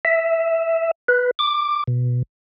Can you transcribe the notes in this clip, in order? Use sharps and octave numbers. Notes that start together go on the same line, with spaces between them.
E5
B4
D6
B2